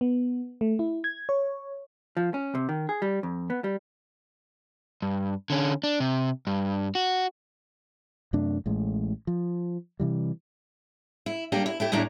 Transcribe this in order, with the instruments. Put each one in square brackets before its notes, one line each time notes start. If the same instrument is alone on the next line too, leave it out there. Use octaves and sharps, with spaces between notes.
[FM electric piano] B3
A3
E4
G#6
C#5
[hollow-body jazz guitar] F3
C#4
C3
D#3
G#4
G3
F2
B3
G3
[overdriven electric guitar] G2
D3 C#4
D4
C3
G2
F#4
[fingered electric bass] F#2 C3 A3 D4
A1 A2 G#3
F3
C3 E3 G3
[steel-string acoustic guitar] E4
G3 A#3 D4 G4
E4
A3 E4 G4
D#2 A2 G3 D4 E4 A#5